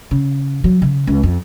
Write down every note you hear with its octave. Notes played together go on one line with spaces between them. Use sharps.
C#3
F#3
C#3
C#2
F2